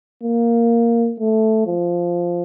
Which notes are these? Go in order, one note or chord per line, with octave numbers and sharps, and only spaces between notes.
A#3
A3
F3